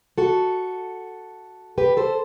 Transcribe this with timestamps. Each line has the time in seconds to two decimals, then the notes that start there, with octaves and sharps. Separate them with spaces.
0.18 F#4 A4
1.78 G4 B4
1.97 A4 C5